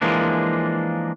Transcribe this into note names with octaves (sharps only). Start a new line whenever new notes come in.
E3 F3 G#3 A#3 D4